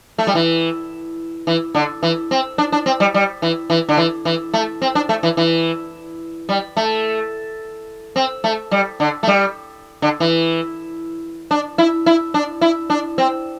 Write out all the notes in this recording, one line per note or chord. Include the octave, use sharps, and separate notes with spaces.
A3
G3
E3
E3
D3
E3
C4
D4
D4
C4
G3
G3
E3
E3
D3
E3
E3
A3
C4
D4
A3
E3
E3
G3
A3
C4
A3
G3
D3
A3
G3
D3
E3
D4
E4
E4
D4
E4
D4
C4